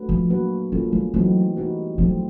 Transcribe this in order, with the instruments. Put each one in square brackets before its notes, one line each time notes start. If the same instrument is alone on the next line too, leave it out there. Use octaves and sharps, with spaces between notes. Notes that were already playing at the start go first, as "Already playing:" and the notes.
Already playing: [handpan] A3 D4 F#4 B4
[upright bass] F3
[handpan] F#3 A#3 D4 F#4 B4
[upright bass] G3 [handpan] A#3 C#4 F4 A4
[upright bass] G3
[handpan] E3 A3 C4 D#4 F#4 [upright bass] F#3
[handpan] G3 B3 D#4 F#4 B4
[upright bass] F3 [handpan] F#3 A3 C4